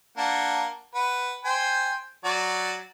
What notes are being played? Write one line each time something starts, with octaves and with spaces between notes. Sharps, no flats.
A#3 D4 F#5
B4 F#5
C5 G5 G#5
F#3 F#4 D5